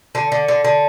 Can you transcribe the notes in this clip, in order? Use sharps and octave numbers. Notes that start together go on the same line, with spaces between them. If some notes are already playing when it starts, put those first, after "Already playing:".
D3
D3
D3
D3